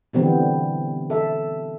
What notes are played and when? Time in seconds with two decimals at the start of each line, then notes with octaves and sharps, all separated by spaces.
0.13 B2 D3 E3 G3 B3 C4
1.10 A4 E5